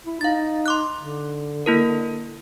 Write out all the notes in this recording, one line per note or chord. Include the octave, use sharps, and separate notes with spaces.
E4
D#4 F5 A6
C6 D6 F#6
D3
A#3 E4 A#4